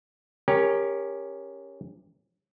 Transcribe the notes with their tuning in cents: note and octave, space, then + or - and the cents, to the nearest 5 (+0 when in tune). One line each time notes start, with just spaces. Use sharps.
C#4 +0 G4 +20 A#4 +0